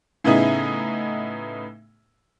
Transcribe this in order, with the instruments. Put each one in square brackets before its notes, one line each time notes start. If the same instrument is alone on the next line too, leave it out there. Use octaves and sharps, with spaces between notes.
[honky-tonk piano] A2 C#3 B3 D#4 E4 G#4